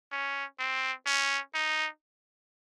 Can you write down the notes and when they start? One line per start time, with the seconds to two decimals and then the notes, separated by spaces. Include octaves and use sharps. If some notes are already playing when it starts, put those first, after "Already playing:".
0.12 C#4
0.59 C4
1.06 C#4
1.54 D#4